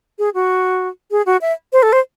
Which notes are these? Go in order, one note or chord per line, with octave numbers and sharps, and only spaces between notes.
G#4
F#4
G#4
F#4
E5
C5
A4
C5